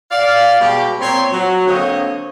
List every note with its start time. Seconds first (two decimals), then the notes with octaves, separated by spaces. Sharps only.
0.11 D5 F5
0.60 B2 G3 G#3 G4
1.00 A#2 C4 C5 C#5 C6
1.32 F#3
1.67 D3 A#3 C4 C#5 D#5